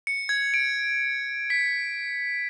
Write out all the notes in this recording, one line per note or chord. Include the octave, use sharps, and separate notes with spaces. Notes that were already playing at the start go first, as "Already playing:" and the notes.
C#7
G#6
D7
B6